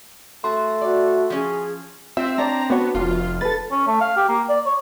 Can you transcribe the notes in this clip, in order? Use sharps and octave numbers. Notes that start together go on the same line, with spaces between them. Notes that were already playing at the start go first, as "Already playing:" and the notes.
A3 F#4 C6
F#4 D5
F3 C#4 G#4
C4 F4 E5
D4 C#5 D5 A#5
B3 D4 F#4 C#5
F1 F4
A4 B4 A6
C#4
A3
F5
G4
A#3
D5
C#5